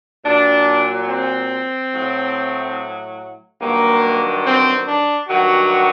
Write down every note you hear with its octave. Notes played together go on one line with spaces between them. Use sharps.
A#2 F#3 D4
C4
A2 F#3
G2 D#3 F#3 A#3
C4
D4
G2 D#3 F#3 F#4